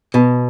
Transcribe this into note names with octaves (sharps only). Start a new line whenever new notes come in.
B2